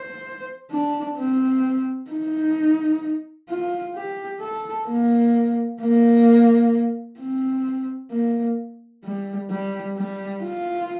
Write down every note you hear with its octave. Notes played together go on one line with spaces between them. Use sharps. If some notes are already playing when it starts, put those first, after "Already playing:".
Already playing: C5
D4
C4
D#4
F4
G4
A4
A#3
A#3
C4
A#3
G3
G3
G3
F4